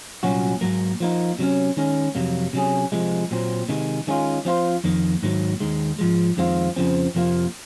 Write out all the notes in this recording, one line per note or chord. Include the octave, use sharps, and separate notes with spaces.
C2 A#2 F#3 C#4 F#4
G#2 F#3 A#3
F3 A#3 D#4
C3 F#3 C#4
D#3 G#3 C#4
F2 C3 F#3 A#3
C3 F#3 C#4 G#4
C3 F3 G#3
A#2 F#3 C4
C3 D#3 G#3
D#3 G#3 C#4 F4
F3 C4 F4 C5
F2 D#3 A#3
G#2 D#3 F#3 A#3
D#2 D#3 G#3
G#2 F3 G#3
F2 D#3 G#3 C4 F4
F2 C#3 F3 C4
F2 C3 F3 A#3 F4